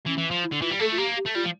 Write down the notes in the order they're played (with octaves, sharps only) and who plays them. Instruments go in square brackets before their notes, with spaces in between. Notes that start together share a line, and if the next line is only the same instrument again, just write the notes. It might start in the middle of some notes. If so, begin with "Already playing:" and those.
[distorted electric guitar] E3 [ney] C#4
[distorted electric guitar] E3
F3
[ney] E4
[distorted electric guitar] D3
[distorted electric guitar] E3 [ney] F4
[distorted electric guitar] G3
[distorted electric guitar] A3 [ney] A4
[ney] F4
[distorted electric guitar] A#3 [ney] G4
[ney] G4
[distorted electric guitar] A3
[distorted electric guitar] G3 [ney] F4
[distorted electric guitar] F3